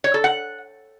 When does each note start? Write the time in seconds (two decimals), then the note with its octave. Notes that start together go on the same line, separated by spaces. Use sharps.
0.04 C#5
0.14 A4
0.24 F#5